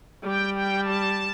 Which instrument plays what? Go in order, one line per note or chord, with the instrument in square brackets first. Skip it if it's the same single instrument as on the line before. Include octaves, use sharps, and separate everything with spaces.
[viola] G3 [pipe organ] G5
[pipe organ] G5
A5